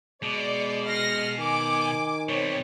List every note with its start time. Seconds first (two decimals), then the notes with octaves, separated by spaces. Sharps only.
0.23 B2 G#3 D5
0.85 F6 A#6 C7
1.38 D#3 G#5 D6
2.29 B2 G3 C4 C#5